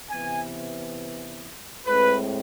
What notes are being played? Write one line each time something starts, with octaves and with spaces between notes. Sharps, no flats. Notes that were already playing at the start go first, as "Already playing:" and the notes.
C3 E3 B3 G#5
A2 G#3 C4 B4